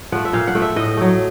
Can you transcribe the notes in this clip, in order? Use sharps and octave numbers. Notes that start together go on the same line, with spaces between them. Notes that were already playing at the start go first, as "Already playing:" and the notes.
F3 A3 F#5
E5
A#2 F5
F#5
F3 A3
E5
A2 D#5
F#3 A3